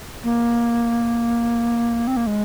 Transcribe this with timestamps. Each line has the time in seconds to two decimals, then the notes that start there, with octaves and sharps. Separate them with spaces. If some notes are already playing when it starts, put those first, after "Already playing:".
0.23 A#3
2.07 C4
2.17 A#3
2.27 G#3